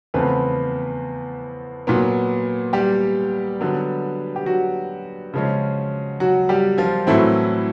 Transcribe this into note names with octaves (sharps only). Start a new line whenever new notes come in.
E2 C#3 F3 A3 B3 C4 B4
A#2 F#3 B3
G3 G4
D3 F#3 B3
G4
F#3 F#4
C#3 F3 G#3 C#4
F#3 F#4
G3 G4
F3 F4
A2 E3 F#3 A3 C4 E4